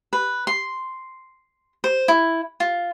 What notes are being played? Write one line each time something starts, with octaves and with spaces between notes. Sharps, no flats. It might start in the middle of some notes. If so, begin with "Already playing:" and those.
B4
C6
C5
E4
F4